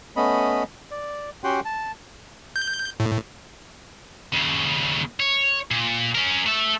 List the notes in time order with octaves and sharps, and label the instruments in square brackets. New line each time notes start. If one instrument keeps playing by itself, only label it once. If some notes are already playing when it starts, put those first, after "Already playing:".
[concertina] A3 B3 C#4 D#5 B5
D5
C#4 F#4 G4 F#5 G5 C6
A5
[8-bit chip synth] G6
A2
[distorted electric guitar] D#2 C#3
C#5
A#2
C#4 A#4
A3 E5